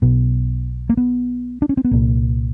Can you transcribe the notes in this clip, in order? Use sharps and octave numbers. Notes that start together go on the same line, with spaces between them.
B1 B2 B3
A#3
B3
D4
C#4
C4
B3
C2 A#2 A#3